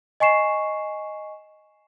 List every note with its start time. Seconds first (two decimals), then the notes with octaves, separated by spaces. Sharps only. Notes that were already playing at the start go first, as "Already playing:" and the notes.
0.20 D#5 G#5 C#6 C7 E7